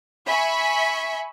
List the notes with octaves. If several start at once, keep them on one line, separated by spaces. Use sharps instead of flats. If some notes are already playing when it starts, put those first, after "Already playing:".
E5 G#5 B5 C#6